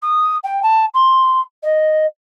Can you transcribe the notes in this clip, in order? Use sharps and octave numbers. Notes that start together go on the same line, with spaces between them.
D#6
G5
A5
C6
D#5